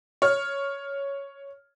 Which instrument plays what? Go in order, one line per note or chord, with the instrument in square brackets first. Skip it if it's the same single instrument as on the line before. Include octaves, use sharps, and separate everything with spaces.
[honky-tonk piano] C#5 F6